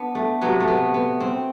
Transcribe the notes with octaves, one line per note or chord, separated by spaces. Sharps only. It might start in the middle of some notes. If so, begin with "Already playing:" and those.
Already playing: B3 D4
A3
C3 F#3 B3
A3
B3
B3
C4